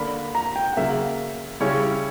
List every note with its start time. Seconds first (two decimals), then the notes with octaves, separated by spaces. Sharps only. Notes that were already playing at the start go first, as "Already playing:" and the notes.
Already playing: D3 A#3 D4 B5
0.35 A#5
0.56 G5
0.72 F#5
0.77 C#3 F#3 A#3 E5
1.60 C#3 G3 C#4 E4 C#5